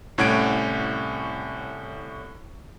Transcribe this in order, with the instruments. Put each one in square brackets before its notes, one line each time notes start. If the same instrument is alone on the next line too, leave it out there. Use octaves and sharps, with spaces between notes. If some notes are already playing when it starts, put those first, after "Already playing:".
[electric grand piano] C2 A2 C#4 F#5 G#6 D7